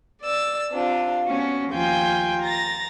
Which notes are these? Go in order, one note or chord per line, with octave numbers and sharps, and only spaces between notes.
D5 E6 A6
C3 D4 F4
B3 C#4 F#4
D#2 F3 F4 G5 G#5 G6
A#5 A6 A#6